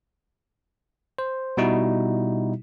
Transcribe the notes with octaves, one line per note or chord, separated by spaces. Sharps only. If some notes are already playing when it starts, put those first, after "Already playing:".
C5
B2 G3 D#4 E4 F#4